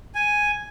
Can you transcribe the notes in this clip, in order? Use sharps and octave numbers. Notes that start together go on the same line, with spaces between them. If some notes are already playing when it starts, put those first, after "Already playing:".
G#5